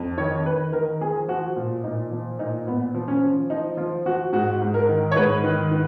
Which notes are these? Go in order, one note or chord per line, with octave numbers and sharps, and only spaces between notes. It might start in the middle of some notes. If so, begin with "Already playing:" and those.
Already playing: F2
D#3 C#5
D#3 B4
D#3 A#4
F3 G#4
F3 F#4
A#2 F4
A#2 D#4
F3
A#2 D#4
A#2 B3
F3
C#4
F3
F3 D#4
F3 F4
F3 F#4
G#2 F#4
G#2
A#4
D#3
C#5
G#2 B4
D#3
D#3